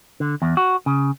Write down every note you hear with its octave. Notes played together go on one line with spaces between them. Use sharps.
D3
E2
F#4
C#3